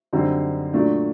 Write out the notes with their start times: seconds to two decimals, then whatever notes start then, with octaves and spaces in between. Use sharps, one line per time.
0.13 F#2 D3 G3 C4 D#4
0.74 A#2 F#3 A3 D4